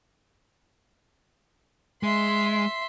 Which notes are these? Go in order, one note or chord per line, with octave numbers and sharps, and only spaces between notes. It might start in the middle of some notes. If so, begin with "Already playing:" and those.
G#3 E5 C6